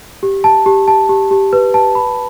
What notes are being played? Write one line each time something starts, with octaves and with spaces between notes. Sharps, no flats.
G4
A5
G4
A5
G4
G4
B4
A5
B5